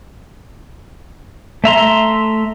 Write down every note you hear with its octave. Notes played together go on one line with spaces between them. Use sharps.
A3 E5 A#5 C6